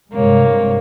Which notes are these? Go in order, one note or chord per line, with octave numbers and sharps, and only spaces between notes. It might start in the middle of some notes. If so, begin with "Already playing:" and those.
G2 C3 G#3 A#3 C#5